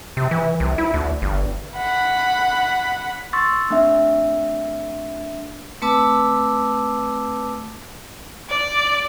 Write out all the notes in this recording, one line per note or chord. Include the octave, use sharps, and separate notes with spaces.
C3
E3
C2
E4
D2
G1
F#5 B5
C6 C#6 E6 A6
A3 C4 D4 E5
A3 C4 B4 A5 D6 E6
D5